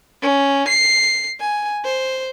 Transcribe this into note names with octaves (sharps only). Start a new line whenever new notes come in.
C#4
C7
G#5
C5